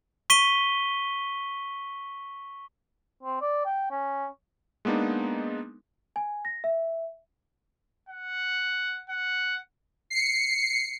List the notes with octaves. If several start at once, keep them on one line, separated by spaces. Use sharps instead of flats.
C#6 B6 D#7 G7
C4
D5
G5
C#4
G#3 A#3 B3 D4 D#4
G#5
A#6
E5
F#5
F#5
C7 C#7